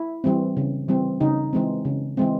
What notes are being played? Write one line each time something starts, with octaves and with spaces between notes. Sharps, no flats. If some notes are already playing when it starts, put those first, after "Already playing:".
Already playing: E4
E3 G3 C4
C#3
E3 G3 C4
C#3 D#4
E3 G#3 C4
C#3
E3 G#3 C4